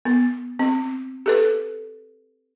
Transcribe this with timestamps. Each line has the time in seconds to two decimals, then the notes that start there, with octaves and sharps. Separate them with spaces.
0.05 B3
0.59 C4
1.26 G4 A4 B4